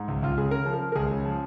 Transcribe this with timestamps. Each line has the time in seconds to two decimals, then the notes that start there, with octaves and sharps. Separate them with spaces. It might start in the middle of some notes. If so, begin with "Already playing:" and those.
Already playing: G#2
0.08 C#2
0.22 C#2 F4
0.37 C#3 G#4
0.51 C#3 A#4
0.66 F3
0.74 A#4
0.81 F3
0.92 A#4
0.96 C#2 G#4
1.11 C#3
1.26 F3